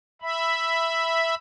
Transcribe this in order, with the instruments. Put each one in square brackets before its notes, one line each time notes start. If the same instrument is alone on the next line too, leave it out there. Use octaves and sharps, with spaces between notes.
[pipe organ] E5 B5